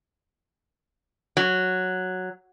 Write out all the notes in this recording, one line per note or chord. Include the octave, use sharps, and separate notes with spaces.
F#3